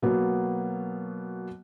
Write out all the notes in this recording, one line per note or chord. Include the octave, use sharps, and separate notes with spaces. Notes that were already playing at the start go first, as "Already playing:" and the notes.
B2 F#3 A#3 B3